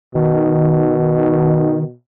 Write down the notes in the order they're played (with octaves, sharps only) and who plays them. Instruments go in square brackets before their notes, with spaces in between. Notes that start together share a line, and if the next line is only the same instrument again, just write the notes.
[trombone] B2 [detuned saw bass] D#3